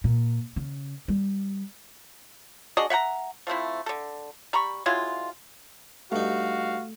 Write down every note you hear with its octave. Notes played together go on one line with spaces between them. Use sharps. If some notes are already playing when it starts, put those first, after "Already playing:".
A#2
C#3
G3
D4 F#4 G#4 D#5
E5 F#5 G5 A#5
F3 A3 C4 E4
D3 A4
G3 A#5 B5 C#6
F#3 G#3 E4 F4
G2 A3 D#4 F#4 F5